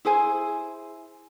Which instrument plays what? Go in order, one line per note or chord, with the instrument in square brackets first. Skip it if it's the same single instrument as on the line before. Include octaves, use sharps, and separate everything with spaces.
[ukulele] E4 G#4 C5 G#5